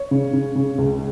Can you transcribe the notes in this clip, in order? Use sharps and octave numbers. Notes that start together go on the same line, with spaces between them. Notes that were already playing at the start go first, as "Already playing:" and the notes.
Already playing: C#5
C#3
C#3
C#3
C#2